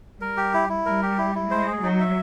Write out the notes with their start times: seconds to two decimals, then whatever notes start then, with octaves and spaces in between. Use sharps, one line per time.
0.20 G3 A#4
0.37 G4
0.54 E4
0.69 E4
0.86 G3 A#4
1.03 G4
1.18 E4
1.35 E4
1.51 G#3 C5
1.67 G#4
1.83 F#3 D#4
2.00 E5